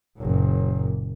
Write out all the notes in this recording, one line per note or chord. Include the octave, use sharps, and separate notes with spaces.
F#1 A#2